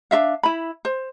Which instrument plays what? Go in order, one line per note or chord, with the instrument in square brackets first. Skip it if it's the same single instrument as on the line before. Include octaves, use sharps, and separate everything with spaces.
[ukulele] D4 F#4 E5 F5
E4 B5
C5